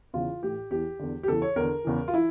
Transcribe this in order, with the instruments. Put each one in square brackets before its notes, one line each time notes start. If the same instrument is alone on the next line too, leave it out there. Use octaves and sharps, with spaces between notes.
[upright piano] E2 C#3 E3 F4
A2 E3 G4
E2 E3 G4
E2 D3
G4
E2 C#3 E3 A4
C#5
E2 D3 A#4
E2 C#3 E3
F4
E3 E4